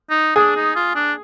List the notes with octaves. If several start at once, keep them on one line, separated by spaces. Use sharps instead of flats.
D#4
D4 G#4
D#4
F4
D4